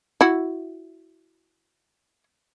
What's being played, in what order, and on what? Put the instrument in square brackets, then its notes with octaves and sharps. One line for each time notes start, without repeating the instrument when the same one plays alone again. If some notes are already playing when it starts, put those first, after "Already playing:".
[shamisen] E4 F#4